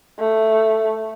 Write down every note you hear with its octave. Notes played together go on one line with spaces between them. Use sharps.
A3